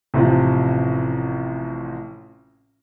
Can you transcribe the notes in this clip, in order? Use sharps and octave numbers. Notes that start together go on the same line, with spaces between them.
A1 C3 F3